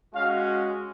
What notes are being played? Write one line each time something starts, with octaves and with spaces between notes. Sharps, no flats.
G#3 C#4 F#4 F5